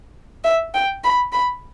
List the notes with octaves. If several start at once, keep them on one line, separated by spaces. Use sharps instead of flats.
E5
G5
B5
B5